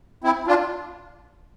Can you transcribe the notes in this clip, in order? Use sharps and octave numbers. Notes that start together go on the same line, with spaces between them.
C4 E4
D4 F4